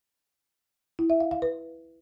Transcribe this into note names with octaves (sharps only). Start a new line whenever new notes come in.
E4
E5
F5
F5
B4